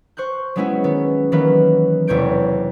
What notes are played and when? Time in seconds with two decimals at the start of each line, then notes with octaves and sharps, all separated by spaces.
0.17 C5 C#6 F#6 G6
0.56 F#3 G#3 B3 C#4 E4 F#4
0.84 D#3 B3
1.32 D#3 E3 F#3 A#3 B3 B4
2.07 E1 E2 C3 C#5 G6 D7